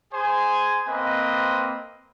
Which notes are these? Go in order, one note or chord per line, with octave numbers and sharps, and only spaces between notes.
G#4 C5 G#5
A#3 C4 B4 D#5